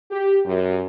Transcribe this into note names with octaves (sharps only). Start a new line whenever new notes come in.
G4
F#2